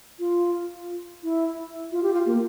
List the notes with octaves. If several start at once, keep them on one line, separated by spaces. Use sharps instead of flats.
F4
E4
F4
G4
F4
A#3